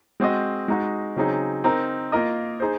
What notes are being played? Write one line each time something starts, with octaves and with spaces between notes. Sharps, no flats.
G#3 C4 F#4 C5 D#5
G#3 D#4 F#4
C#3 F#3 C4 D#4 G#4
C4 D#4 A#4
A#3 F4 A#4 D#5
D#4 G#4 C5